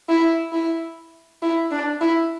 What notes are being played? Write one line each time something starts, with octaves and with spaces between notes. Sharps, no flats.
E4
E4
E4
D4
E4